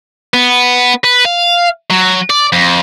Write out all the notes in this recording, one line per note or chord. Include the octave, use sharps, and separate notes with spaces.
B3
B4
F5
F#3
D5
F2